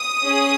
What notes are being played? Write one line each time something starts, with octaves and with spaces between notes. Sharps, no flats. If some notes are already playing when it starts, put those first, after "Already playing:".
Already playing: D#6
C#4 G#4